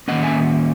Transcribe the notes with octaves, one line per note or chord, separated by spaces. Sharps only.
D#3 A#3 C#4 D#5 F#5
E5 G#5